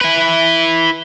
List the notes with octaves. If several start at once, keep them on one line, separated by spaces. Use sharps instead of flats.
E4 B4